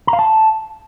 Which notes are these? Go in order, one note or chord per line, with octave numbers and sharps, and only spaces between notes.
A#5
F5
A5